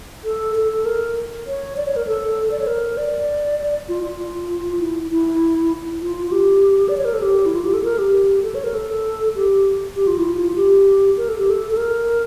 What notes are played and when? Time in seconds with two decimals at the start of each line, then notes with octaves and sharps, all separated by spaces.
0.24 A4
0.56 A4
0.85 A#4
1.47 C#5
1.77 D5
1.86 C#5
1.96 A#4
2.07 A4
2.51 D5
2.60 C#5
2.67 A#4
2.97 D5
3.88 F4
4.04 F4
4.79 E4
5.11 E4
6.01 F4
6.27 F4
6.32 G4
6.89 D5
6.97 C#5
7.05 A#4
7.13 A4
7.22 G4
7.46 E4
7.55 F4
7.65 G4
7.74 A4
7.83 A#4
7.98 G4
8.43 A4
8.55 C#5
8.64 A#4
8.74 A4
9.36 G4
9.96 G4
10.07 F4
10.18 E4
10.28 F4
10.52 F4
10.56 G4
11.17 A#4
11.29 A4
11.38 G4
11.50 A4
11.71 A4
11.77 A#4